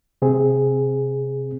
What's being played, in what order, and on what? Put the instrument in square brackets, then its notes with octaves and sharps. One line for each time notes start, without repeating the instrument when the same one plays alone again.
[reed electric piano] C3 C4 G#4